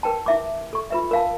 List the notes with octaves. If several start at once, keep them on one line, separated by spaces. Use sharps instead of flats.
A#4 B4 G5 A5
E4 E5 D6
A4 C#6
F4 B4 E5
A#4 F5 A5